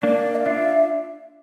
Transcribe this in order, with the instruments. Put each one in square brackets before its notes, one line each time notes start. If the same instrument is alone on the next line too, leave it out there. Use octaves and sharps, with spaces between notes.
[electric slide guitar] A#3 D4 [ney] D5
[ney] F5
[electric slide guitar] D4 F4 [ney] E5